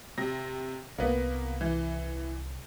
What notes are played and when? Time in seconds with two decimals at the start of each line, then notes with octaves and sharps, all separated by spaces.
0.18 C3 A#6
0.98 C2 A#3 B3
1.61 E3